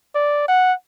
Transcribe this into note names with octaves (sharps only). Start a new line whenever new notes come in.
D5
F#5